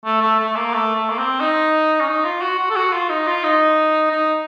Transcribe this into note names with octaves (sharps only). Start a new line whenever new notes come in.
A3
A3
A3
A#3
A3
A3
A#3
C4
D#4
C#4
D#4
F4
F#4
F#4
A4
F#4
F4
D#4
F4
D#4
D#4